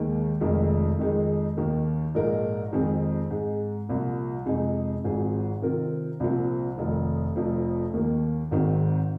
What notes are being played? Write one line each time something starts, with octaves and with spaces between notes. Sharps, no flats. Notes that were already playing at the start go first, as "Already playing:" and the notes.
Already playing: D#2 D#3 G#3
F1 F2 D#3 G#3
F2 D#3 G#3 D#4 G#4
D#2 D#3 A#3
A#1 G#2 G#3 D#4 A#4
F2 D#3 G#3 C4 G#4
G#2 G#3 D#4
C2 A#2 F3
F2 C3 G#3 D#4 G#4
G#1 G#2 F3 C4 G#4
C3 D#3 C4 F4 A#4
C2 A#2 F3 C4
F1 F2 D#3
F1 F2 F3 C4
D#2 D#3 A#3
G#1 G#2 D#3 C4